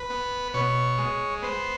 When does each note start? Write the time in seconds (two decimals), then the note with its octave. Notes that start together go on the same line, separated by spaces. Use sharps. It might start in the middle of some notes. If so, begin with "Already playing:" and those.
Already playing: B4
0.10 B3
0.54 B2 C#5
0.98 G#3
1.42 B3 C5